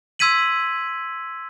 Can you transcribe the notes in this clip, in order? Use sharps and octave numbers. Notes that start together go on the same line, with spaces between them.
C6 E6 G#6 B6 D#7 F#7